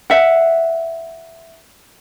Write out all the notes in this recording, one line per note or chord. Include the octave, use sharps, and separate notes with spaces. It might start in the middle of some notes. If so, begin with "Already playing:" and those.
E5 F#5